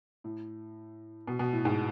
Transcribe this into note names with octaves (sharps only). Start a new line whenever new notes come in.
A2
B2
B2
A2
G#2